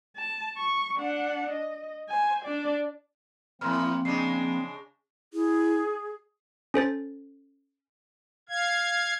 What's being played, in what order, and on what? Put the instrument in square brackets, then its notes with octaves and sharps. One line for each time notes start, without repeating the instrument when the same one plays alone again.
[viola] A5
C#6
D4 F#5
D#5
C5 G#5
D4 D5
[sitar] A2 E3 [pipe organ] F3 A#3 C4 [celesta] C6 F6
[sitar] C#3 G#3 D4 [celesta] C7
[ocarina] E4 [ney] G#4
[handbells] C#4 A4 C5 A6
[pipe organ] F5 G#6